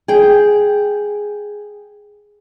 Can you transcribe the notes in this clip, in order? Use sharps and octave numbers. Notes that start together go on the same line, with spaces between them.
G#4 G5